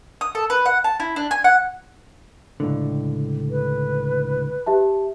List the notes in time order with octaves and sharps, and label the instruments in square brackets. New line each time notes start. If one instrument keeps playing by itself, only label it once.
[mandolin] D#6
A4
B4
F#5
A5
E4
D4
G#5
F#5
[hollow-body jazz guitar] C#2 A2 D3
[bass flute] B4
[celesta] G4 E5 A5